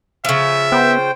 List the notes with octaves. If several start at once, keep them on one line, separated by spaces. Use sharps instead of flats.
C#3 F3 E5
B3 C5 G5